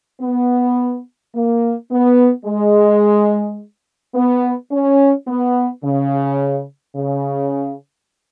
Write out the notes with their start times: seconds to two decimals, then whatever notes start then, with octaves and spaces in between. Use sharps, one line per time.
0.21 B3
1.34 A#3
1.90 B3
2.45 G#3
4.14 B3
4.71 C#4
5.28 B3
5.83 C#3
6.95 C#3